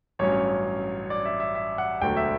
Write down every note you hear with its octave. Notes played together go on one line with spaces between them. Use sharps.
A1 G2 F#3 C#4 C#5
D5
E5
E5
E5
F#5
E1 D2 D3 F#3 G5
E5